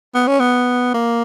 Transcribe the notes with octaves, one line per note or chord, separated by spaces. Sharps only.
B3
C#4
B3
A#3